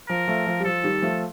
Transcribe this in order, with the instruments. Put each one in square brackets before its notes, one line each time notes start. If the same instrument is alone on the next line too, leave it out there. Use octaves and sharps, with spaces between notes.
[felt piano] F3 [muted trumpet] A#4
[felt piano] F3 A3
F3
G3
[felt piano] F3 [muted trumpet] A4
[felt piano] D#3 G3
F3 A3